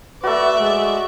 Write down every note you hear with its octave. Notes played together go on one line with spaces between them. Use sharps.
A3 F#4 B4 D5 E5
G#3